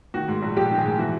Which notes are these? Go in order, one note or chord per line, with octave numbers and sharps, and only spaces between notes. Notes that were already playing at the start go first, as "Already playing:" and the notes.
D#3 F#4
G#2
A#1
A#1 G4
D#3
G#4
G#2
E3 F#4